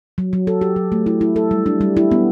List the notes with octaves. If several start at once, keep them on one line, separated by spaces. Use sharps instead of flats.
F#3
F#3
A4
G4
F#3
A3
E4
E4
A4
G3
D4
G3
E4
B3